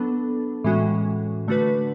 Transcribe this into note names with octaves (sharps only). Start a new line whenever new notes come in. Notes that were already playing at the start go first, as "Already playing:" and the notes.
Already playing: F#3 B3 D4 A4
A2 E3 G#3 C#4 F#4
D3 A3 D4 F#4 B4